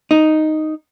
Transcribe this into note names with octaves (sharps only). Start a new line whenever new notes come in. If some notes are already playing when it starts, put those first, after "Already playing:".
D#4